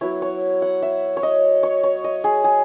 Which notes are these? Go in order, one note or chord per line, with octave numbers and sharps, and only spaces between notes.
F#3 B3 E4 C#5
C#5
F#5
E5
C#5
D#5
C#5
C#5
D#5
G#4
G#4